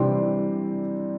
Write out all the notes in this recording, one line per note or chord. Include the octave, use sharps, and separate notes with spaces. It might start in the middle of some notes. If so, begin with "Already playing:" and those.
Already playing: C3 E3 G3 D4 G5 C6